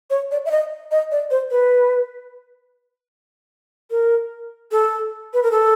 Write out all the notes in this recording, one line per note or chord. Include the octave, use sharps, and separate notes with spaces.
C#5
D5
E5
D#5
D#5
D5
C5
B4
A#4
A4
B4
A#4
A4